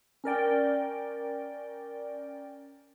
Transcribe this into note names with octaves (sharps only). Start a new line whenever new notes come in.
C#4 A#4 D5 G5